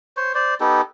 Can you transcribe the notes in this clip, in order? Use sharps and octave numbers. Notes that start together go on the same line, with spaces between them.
C5 C#5
C5 D5
B3 D#4 G4 A4